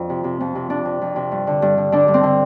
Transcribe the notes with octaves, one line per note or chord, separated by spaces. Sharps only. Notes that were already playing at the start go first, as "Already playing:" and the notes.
Already playing: F2 C4 D4
C3
C3
F2
C3
C3 D4
C3
F2
C3
G2
D3
G2
D3
D3 D4
G2
C4
D3